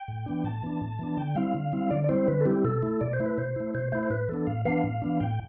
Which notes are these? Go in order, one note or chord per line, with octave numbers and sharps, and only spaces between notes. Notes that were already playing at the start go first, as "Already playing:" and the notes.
Already playing: G5
A2
E3 B3 D4
A2 A5
E3 B3 D4
A2
E3 B3 D4
D3 G5
G3 C4 E4 F5
D3
G3 C4 E4
D3 D5
D5
G3 C4 E4 C5
D3 B4
A4
G3 C4 E4 G4
B2 A4
A3 E4
B2 D5
C5
A3 E4
B4
B2 C5
A3 E4
B2 C5
A3 E4 C5
C5
A2 B4
E3 B3 D4 A4
A2 F5
E3 B3 D4 F5
A2
E3 B3 D4
A2 G5